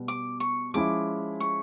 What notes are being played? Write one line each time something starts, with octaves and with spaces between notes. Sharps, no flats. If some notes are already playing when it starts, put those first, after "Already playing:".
Already playing: B2 G3 B3
D6
C#6
F3 G#3 C#4 E4 D6
C#6